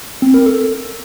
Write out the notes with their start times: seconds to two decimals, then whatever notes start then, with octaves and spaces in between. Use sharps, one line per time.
0.22 C4
0.34 A#4
0.46 A4